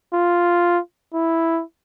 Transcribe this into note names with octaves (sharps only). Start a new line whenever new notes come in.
F4
E4